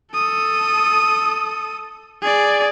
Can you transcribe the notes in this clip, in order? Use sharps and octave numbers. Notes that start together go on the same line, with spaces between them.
A4 D#6
G#4 D5